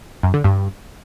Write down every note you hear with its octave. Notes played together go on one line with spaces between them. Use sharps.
F#2
D3
G2